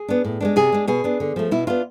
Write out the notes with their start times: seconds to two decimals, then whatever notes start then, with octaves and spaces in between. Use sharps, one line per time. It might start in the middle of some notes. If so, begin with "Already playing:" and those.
Already playing: G#4
0.08 B3 D4
0.25 A2
0.40 G#3 B3 D4
0.56 C3 G#4
0.72 G#3 D4
0.88 B2 G#4
1.04 B3 D4
1.20 D3
1.36 F3 A3
1.51 B2 E4
1.67 B3 D4 F4